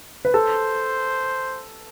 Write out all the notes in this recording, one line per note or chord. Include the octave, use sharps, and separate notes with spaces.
B4
A4 C5